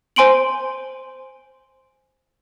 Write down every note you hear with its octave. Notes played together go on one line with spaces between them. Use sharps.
C5 G#5 C6 D7 F#7